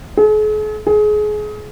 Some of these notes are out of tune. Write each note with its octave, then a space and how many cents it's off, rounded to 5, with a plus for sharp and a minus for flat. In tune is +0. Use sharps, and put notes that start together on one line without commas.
G#4 +45
G#4 +25